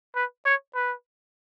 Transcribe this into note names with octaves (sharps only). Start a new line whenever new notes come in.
B4
C#5
B4